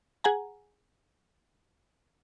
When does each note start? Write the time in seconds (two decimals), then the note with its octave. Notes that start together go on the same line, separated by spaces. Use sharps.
0.24 G#4 F#5 G#5 A#5